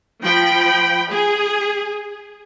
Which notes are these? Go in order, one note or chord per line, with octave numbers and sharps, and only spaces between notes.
F3 G5 B5
G#4